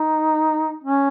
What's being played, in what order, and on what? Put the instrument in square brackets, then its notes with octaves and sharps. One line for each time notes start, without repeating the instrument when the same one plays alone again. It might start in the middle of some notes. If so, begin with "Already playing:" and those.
Already playing: [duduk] D#4
C#4